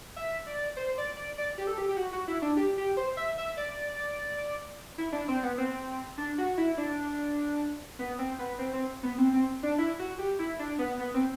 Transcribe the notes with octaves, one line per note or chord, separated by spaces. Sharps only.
E5
D5
C5
D5
D5
D5
G4
A4
G4
G4
F#4
F#4
E4
D4
G4
G4
C5
E5
E5
D5
E4
D4
C4
B3
C4
D4
F#4
E4
D4
B3
C4
B3
C4
C4
B3
C4
C4
D4
E4
F#4
G4
E4
D4
B3
B3
C4